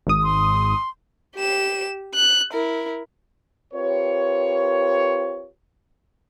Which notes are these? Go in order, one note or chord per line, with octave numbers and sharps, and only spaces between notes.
G#1 G#2 D#6
C6
G4 E7
F#6
E4 A#4
C4 F4 G4 A#4 B4 C#5